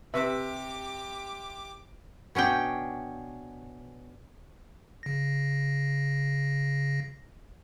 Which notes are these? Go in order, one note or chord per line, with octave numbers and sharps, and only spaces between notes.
C3 G4 B4 E5 D6
B2 C#4 D4 G5
C#3 A#6